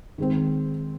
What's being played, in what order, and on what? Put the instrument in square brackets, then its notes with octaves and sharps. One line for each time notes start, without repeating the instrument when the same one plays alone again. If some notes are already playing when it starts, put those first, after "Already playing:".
[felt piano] D#3 G#3 C4